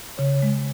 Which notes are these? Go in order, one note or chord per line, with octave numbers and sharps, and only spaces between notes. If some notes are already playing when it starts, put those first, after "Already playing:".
C#3 C#5
G#3